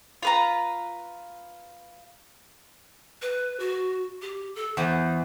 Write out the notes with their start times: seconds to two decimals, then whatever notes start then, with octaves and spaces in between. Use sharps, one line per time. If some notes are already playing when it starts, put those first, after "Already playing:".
0.23 F4 B4 A#5
3.22 B4
3.60 F#4
4.22 G4
4.56 A4
4.77 E2 C5